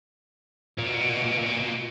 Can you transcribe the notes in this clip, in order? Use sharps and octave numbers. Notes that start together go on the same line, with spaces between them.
A#2
B2
A#2
B2
A#2
B2
A#2
B2
A#2
B2
A#2
B2
A#2